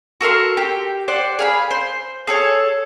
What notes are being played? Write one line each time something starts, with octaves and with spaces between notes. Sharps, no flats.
F#4 A4 A#4 C6
G4
C5 D5 F#5
G#4 F5 B5
C5
G#4 A4 C#5